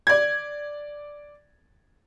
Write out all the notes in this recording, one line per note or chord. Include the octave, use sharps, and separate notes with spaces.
D5 G#6